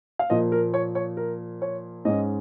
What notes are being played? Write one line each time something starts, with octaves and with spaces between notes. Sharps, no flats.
F5
A#2 F3 A#3 D#5
A#4
C#5
C#5
A#4
C#5
G#2 G#3 C#4 D#5